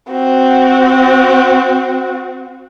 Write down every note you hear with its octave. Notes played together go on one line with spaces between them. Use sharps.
C4 F#4